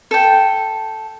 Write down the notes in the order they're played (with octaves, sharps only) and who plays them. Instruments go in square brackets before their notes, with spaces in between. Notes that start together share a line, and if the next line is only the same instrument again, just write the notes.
[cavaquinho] A4 G5